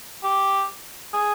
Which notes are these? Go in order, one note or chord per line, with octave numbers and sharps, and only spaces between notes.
G4
G#4